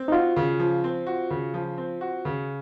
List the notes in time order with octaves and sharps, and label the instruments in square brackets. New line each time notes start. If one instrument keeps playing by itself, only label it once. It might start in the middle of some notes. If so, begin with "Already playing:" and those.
Already playing: [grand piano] C4
[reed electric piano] D#4
[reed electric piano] F4 [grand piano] F#4
[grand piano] C#3
F3
C4
F#4
C#3
F3
C4
F#4
C#3